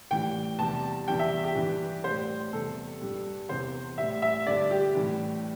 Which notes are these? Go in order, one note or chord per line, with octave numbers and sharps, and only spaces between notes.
A2 E3 G3 G5
E2 C3 G3 A5
E2 E3 G3 G5
E5
G4
G2 E3 G3
A2 G3 C5
E2 C3 G3 A4
G2 G3
E2 C3 E3 C5
A2 G3 E5
E5
G2 D3 G3 D5
G4
A2 E3 G3